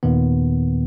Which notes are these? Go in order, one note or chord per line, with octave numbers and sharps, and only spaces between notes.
D#2 A#2 D#3 B3